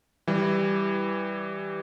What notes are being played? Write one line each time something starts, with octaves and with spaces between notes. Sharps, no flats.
E3 G3